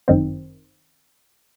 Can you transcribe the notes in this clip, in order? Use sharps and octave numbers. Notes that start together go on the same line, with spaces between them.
G1 F#2 D#3 C4